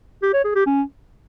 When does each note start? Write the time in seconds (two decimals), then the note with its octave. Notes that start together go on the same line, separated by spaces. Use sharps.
0.23 G4
0.34 C#5
0.44 G#4
0.55 G4
0.66 C#4